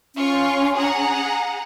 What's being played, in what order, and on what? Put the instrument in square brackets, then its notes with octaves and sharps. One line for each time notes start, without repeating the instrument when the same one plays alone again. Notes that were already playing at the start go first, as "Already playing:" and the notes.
[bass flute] C#4 [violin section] F4 C#6
[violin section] G#4 F#5 A#5